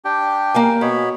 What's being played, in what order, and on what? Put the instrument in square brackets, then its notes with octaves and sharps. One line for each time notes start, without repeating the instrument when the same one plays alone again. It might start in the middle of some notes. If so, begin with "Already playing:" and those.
[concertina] D4 G4 G5
[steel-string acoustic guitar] A#3 F5 G#5
[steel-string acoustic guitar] B2 [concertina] B3 C#5 B5